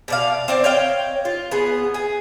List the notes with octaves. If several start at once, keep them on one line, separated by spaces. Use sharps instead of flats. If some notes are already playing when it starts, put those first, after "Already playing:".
B2 D5 F5
C4 C5 D5
C#5 D#5 F5 G5
F4
B3 G#4
G#4